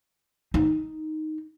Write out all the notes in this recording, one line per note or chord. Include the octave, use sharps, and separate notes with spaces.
D#4